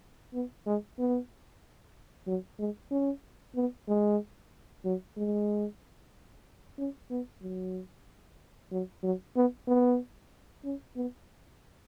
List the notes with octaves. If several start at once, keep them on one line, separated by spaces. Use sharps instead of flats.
B3
G#3
B3
F#3
G#3
C#4
B3
G#3
F#3
G#3
C#4
B3
F#3
F#3
F#3
B3
B3
C#4
B3